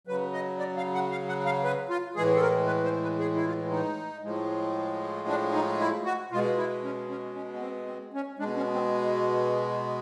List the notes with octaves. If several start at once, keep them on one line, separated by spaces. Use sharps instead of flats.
C#3 F#3 B4
D#5
D5
F5
F#5
F5
F#5
F5
B4
F4
A2 E3 G#3 G#4
A4
A#4
B4
C5
B4
G#4
E4
F4
D#4
A2 F3 G#3
D4
D#4
E4
F#4
B2 G#3 F4
E4
C#4
C#4
C#4
B3
C4
C4
C#4
B2 G#3 D4
C#4
C4